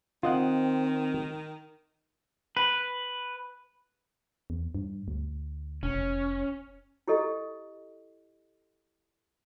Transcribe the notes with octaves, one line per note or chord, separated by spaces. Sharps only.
D#3 C4 F4 D#5 F#5
B4
E2
G2
D2
E1 C#4
F1
E4 G4 A4 D#5